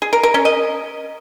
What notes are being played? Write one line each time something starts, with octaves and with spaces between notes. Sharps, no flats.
G#4
A#4
A#4
C#4
D#5